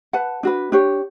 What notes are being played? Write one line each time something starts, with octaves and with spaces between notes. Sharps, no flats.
B4 F#5 A5
D4 F#4 B4
D4 G4 C#5